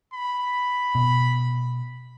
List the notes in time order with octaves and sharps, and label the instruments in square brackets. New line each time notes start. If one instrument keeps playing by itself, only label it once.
[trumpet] B5
[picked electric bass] B2